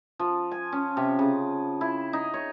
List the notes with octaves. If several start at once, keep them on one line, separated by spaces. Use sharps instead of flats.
F3
G#5
C#4
C3
C#3
E4
D#4
C#5